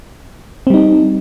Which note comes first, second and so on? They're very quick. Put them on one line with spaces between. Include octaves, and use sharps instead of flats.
C4 G3 D#4